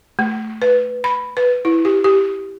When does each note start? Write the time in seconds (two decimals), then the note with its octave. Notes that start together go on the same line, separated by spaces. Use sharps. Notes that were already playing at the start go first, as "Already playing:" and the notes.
0.19 A3
0.62 B4
1.04 B5
1.37 B4
1.65 E4
1.85 G4
2.04 G4